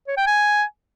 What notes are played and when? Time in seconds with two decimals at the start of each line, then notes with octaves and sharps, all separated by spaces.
0.07 C#5
0.17 G5
0.26 G#5